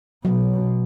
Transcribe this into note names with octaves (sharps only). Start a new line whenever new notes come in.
B2 F#3